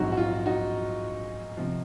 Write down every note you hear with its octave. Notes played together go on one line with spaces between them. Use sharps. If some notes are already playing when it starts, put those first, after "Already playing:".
Already playing: A#1 G#2 F#3 C4 D#4 F#4
F#4
F4
D#4 F#4
C3 F3